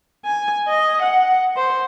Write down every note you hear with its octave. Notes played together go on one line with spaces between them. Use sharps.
G#5
D#5
F#5
C5